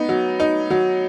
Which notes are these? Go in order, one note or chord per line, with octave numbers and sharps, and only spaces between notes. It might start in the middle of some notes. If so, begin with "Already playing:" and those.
Already playing: B3 D#4
F#3
D#4
F#3